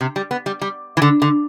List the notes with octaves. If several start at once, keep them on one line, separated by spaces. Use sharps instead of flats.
C3
G3
B3
G3
G3
E3
D3
D3